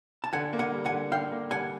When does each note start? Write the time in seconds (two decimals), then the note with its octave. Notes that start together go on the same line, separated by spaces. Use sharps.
0.24 A5
0.33 D3 F#5 G#5
0.53 A#3
0.59 F#5 G#5
0.72 G3
0.86 F#5 G#5
0.92 D3
1.12 D3 F5 G5
1.32 A#3
1.51 G3 F#5 G#5